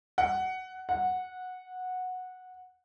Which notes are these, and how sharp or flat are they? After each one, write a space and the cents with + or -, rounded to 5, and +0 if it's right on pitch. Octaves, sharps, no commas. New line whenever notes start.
F#5 +15
F#5 -10